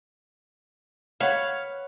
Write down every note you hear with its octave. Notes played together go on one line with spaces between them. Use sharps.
B4 C#5 F5 F#5